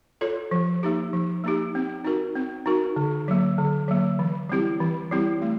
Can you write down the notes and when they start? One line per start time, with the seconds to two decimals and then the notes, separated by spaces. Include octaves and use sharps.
0.21 F4 A4 C#5
0.51 F3
0.83 A#3 D#4 G4
1.13 F3
1.44 A#3 D#4 G4
1.75 C4
2.04 D#4 F#4 A#4
2.35 C4
2.66 D#4 F#4 A#4
2.96 D3
3.28 F#3 A#3
3.58 D3
3.88 F#3 A#3
4.19 E3
4.49 G3 C4 E4 G4
4.80 E3
5.11 G3 C4 E4 G4
5.42 A3